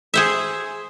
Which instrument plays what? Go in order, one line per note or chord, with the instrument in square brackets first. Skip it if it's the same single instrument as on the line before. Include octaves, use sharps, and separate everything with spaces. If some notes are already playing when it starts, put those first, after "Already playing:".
[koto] G#4 C5 E5